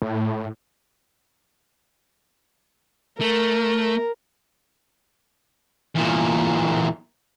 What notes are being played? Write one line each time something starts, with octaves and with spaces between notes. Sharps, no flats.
A2
A3 A#4
E2 A#2